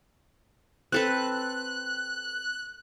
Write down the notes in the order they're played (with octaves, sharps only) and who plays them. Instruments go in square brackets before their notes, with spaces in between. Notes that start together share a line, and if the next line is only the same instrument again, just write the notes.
[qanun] C4 A4 B4 [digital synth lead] F#6